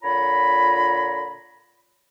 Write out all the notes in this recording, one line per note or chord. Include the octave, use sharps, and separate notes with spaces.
A#2 D3 F4 C#5 A#5 B5